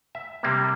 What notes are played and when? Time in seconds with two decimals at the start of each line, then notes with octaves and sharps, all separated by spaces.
0.15 E5
0.43 C3 G3 A#3